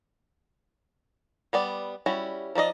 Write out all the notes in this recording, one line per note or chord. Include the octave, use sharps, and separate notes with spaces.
G3 B3 D5
G3 C#4 E4 F#4
F3 D#4 D5 D#5